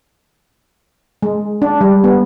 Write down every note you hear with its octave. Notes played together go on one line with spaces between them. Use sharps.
G#3
D4
G3
B3